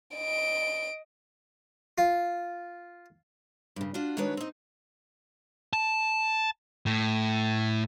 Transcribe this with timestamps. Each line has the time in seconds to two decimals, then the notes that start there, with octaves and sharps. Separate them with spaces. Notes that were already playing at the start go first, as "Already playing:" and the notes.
0.16 D#5 D7
1.98 F4
3.76 G2 C#3
3.94 D4 F4 F#4
4.17 D#3 G#3 D4 F#4 B4 C#5
4.37 C4 D#4
5.73 A5
6.86 A2